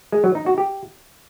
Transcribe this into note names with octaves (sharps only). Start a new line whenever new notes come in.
G#3
F#3
D#4
F#4
G4